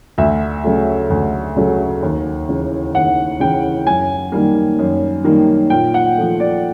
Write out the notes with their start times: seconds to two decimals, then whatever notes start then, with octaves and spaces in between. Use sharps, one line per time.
0.18 D2 E5
0.64 C#3 F#3 A3
1.10 D2
1.56 C#3 F#3 A3
2.03 D#2
2.49 C#3 E3
2.94 D#2 F#5
3.40 C#3 E3 G5
3.87 F#2 G#5
4.32 D#3 G3 A#3
4.79 F#2
5.24 D#3 G3 A#3
5.70 A#2 G5
5.94 F#5
6.17 F3 A3
6.40 D5